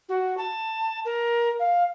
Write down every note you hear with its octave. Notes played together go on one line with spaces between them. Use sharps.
F#4
A5
A#4
F5